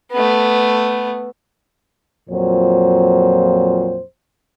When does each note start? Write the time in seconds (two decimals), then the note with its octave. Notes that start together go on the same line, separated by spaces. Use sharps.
0.12 A3 B3
2.29 F2 A#2 F#3 C5